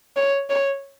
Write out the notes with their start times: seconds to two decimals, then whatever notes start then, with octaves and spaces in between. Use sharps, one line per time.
0.16 C#5
0.50 C#5